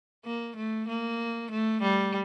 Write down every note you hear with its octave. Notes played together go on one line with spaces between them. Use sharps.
A#3
A3
A#3
A3
G3